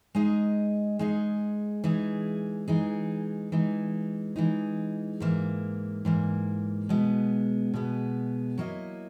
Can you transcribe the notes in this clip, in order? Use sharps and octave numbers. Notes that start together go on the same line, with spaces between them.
G#3 D#4 G#4 D#5
G#3 D#4 G#4 D#5
E3 G#3 D#4 G#4
E3 G#3 D#4 G#4
E3 G#3 D#4
E3 G#3 D#4
G#2 E3 A#3
G#2 E3 A#3
B2 G#3 B3
B2 G#3 B3
F#3 A#3 E4 A#4 D#5